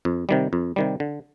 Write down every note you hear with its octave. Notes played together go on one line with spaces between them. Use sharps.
F2
C3 D#3 G3
F2
C3 D#3 G3
D3